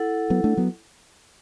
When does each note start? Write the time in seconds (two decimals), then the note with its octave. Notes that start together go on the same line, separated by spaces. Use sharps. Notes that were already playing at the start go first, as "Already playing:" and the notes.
Already playing: E4 A4 F#5
0.30 F#3 B3
0.44 A3 D4
0.57 F#3 B3